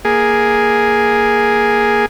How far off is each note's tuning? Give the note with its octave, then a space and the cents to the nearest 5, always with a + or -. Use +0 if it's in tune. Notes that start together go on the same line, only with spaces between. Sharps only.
A#3 +5 G#4 +0